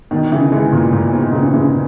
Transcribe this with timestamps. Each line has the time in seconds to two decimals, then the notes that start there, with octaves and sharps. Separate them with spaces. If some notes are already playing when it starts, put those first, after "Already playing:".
0.11 B2 D#3
0.31 C#3 E3
0.52 E3 G#3
0.72 A#2
0.93 A#2
1.13 G#2 B2
1.32 A#2 C#3
1.53 C#3 E3